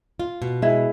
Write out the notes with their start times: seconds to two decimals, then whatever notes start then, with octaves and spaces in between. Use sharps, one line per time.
0.20 F4
0.42 B2
0.62 G#3 E4